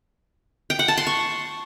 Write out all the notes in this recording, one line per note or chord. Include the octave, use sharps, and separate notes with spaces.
G5
F#5
A5
C6
C#6